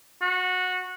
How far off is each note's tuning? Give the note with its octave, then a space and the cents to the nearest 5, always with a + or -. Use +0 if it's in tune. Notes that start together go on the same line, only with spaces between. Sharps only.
F#4 -15